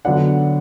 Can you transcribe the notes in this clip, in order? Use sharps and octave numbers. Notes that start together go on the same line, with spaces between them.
D3 F#3 B3 D4 F#5